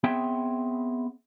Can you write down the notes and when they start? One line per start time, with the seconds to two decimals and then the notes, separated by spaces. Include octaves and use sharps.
0.04 B3 C4 G#4 C#5 E5 G5